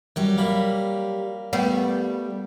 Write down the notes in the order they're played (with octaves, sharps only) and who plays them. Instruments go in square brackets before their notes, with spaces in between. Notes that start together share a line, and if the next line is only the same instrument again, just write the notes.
[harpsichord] F#2 [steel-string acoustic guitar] F#3 G3 G4
[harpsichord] A#3 B5
[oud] G3 B3 [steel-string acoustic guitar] A3